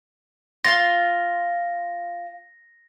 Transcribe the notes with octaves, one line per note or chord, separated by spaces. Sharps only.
F4 F5 A#6